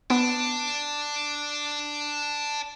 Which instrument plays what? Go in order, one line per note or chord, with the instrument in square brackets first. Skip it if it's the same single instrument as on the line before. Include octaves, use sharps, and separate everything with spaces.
[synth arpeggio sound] B3 [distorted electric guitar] D4